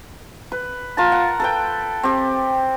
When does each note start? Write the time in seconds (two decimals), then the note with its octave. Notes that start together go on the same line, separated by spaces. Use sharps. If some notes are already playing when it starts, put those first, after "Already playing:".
0.52 B4
0.97 F4 A#4 A5
1.12 F#5
1.40 A4 B4 G5
2.03 C4 G4